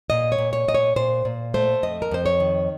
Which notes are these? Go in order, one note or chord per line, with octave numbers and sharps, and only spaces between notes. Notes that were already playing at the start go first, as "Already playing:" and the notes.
A#2 D#5
C#5
A#2
C#5
A#2 D#5
C#5
A#2 C5
A#2
A3 C5
F2 D#5
A#4
F2 C5
C#5
D#3